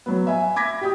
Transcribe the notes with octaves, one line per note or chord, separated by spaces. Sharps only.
F#3 B3
E5 G#5
B5 D6 G#6 A#6 B6
G4 G5 D#6